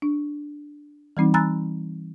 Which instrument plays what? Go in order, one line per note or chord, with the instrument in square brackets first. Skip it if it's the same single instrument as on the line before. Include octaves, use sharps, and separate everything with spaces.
[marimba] D4
E3 G3 C4 D#4
G#5 A#5 B5 E6 F#6 A6